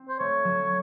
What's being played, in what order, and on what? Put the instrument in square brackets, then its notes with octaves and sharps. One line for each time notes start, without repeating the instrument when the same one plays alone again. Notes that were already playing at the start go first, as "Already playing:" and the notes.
Already playing: [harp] C4
[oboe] C5
[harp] A3 [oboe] C#5
[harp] F#3